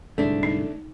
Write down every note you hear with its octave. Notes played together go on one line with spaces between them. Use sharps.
C2 G#2 D3 A3 D4
D#4